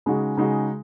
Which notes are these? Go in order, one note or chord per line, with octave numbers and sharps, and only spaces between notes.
C#3 G#3 D#4 F#4
C#3 G#3 D#4 F#4